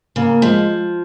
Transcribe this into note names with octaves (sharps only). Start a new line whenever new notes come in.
C#3 A#3
F3 G#3